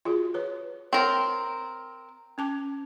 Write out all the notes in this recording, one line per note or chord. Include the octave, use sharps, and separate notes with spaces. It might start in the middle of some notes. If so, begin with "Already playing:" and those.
F4 F#4 G#4
B4 C#5
C4 A#4 C#5
C#4 A5 D6